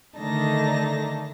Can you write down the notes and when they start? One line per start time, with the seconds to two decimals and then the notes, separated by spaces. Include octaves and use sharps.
0.17 D3 D#3 A3 D#4 A5 A#6